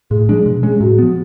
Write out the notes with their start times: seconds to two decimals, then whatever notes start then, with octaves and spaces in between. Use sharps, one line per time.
0.11 A2 G#4
0.29 F3 G#3 D4
0.46 B2
0.63 G#3 C#4
0.70 G#4
0.81 A2 F#4
0.98 F3 B3